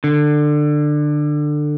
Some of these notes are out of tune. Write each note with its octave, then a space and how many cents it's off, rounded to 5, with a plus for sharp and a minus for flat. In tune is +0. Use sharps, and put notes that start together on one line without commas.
D3 +20